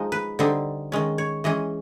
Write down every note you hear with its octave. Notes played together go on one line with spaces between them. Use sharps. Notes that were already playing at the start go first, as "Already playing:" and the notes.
Already playing: F3 G#3 D#4
B4
D3 G3 C4 D#4
D#3 G#3 C#4
C#5
E3 G#3 C#4 D#5